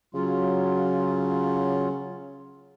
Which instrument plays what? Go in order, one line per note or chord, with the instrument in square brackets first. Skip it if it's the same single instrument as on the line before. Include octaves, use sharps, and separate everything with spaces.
[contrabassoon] C#3 [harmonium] F#3 F4